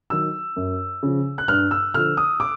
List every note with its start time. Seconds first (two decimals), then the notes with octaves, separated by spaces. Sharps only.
0.10 D#3 F#3 E6
0.56 F#2
1.03 C#3 F3
1.38 F#6
1.48 G2 F6
1.71 E6
1.94 D3 F3 F6
2.17 D#6
2.40 D6